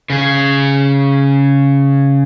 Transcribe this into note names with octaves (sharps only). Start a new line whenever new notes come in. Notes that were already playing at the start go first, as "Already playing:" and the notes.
C#3 G#4